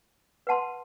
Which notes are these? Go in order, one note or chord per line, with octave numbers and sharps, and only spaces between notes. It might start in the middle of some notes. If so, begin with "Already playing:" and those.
B4 F#5 A5 C6